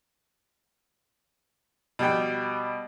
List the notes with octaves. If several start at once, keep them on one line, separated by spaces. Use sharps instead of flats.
B2 G3 G5